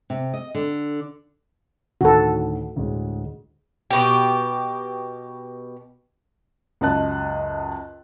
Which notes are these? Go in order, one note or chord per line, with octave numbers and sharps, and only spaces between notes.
C3
D#5
D3
D2 A2 D#3 F#4 A4
D2 A2 G#3
B2 G4
C#2 F#2 D#5 A5 F#6